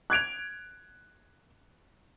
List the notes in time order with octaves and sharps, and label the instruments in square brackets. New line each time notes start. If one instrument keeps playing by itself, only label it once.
[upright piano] F#6 G#6 D7 F7